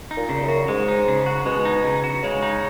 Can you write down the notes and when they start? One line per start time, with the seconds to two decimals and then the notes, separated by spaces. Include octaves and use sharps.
0.11 D#4
0.17 A#2
0.29 C#3
0.42 F#2
0.48 F#4
0.68 G#2 G#3
0.88 D#4
1.08 C#3
1.26 F#4
1.46 B2 G#3
1.65 D#4
1.84 C#3
2.04 F#4
2.23 C#3 G#3
2.43 D#4